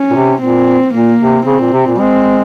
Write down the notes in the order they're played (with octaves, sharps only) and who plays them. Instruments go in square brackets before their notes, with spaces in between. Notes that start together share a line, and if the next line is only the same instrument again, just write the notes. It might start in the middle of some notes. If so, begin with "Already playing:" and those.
Already playing: [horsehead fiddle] C#4
[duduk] A#2
C3
[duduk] A#2 [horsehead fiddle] C4
[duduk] A#2 [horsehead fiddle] A#3
[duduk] C3
[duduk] C#3 [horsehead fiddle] C4
[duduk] A#2
C3
A#2
[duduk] G#3 [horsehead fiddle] C4